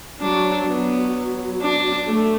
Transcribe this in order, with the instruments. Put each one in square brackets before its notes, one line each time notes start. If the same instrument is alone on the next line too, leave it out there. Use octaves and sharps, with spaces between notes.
[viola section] F#3 [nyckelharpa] D4
[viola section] F#3 [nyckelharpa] B3
[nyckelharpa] D4
[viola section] A3